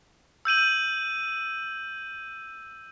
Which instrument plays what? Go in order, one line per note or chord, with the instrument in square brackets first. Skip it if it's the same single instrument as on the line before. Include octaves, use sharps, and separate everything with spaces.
[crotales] E6 G6 D#7 F#7